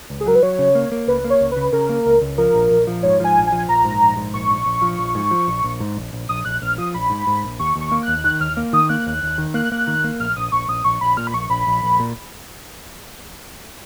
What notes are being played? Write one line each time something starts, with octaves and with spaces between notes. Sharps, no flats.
C#2
G#4
F#3 A#4
B4
F#3 C#5
C#3
A#3
A#3
C#2 B4
A#3
C#5
C#2
C#3 B4
C#3 A#4
A#3
C#2
C#2
F3 A#4
A#1
A#1
F3
G#2 C#5
F3 G#5
A#1
G#5
F3
A#1 A#5
G#2
A#1
G#2
A#1 C#6
A#1
A#1
F3
A#1
G#2
F3
A#1
A#1
G#2
A#1
A#1
A#1 D#6
A#1 F#6
A#1 F6
F3 D#6
A#1 B5
G#2
G#2
A#1
D#2 C#6
D#2
C#6
A#3
D#2 F#6
D#3 F#6
D#2 F6
A#3
D#3 D#6
A#3 F#6
D#2
D#2
D#3
A#3 F#6
A#3
D#3
A#3
A#1 F6
A#1 D#6
A#1 C#6
A#1 D#6
A#1 C#6
A#1 B5
A#2 F6
B5
A#1 C#6
A#1 B5
A#1
A#1
A#2